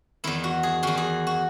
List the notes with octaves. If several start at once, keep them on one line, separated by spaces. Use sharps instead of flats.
E2 D#3 E4
F#4
G#4
E2 D#3 F#4
G#4
F#4